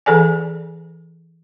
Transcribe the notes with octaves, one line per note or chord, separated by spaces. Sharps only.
E3 G#4 A4 D5 G#5